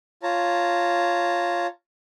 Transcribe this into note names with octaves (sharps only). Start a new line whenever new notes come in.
F4 C#5 A5 A#5